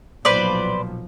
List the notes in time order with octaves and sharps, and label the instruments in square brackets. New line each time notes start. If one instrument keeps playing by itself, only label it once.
[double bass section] B1 A#2 F3 [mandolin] B4 C5 D5